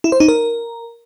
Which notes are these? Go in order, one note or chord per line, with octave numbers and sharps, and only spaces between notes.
E4
C5
D#4
A#4